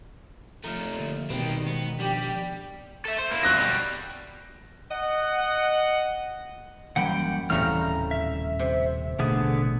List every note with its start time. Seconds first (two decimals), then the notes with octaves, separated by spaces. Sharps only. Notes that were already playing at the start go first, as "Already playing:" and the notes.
0.64 F3 A3 A#5 F6
0.98 D3 A#3
1.30 B2 D#3 G3 C4 B4 G5
1.66 G#3 B3 C5
1.99 F3 G3 D4 G4
3.05 A4 E5
3.19 C5
3.32 A#3 E4
3.43 F2 F#3 F#6 A#6
3.55 B2 G3
4.90 D#5 F#5
6.96 F#2 E3 G3 A#3 F#5 G5 B5
7.50 D#1 A2 C#3 E3 G3 C4 A#5 F6
8.11 E5
8.59 C3
9.19 A1 B2 D3 A3 B3 G#4